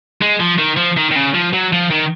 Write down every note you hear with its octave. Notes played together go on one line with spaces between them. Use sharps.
G#3
F3
D#3
F3
D#3
D#3
C#3
F3
F#3
F3
D#3